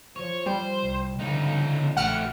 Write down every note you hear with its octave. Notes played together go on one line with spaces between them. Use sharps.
F3 C#5
G3 C5
C2
C#2 D3 D#4
A#1 A3 G4 F#5 F6 C#7